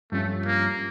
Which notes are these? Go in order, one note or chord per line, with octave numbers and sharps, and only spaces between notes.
G2 F3 A3 C#4 F4
A#3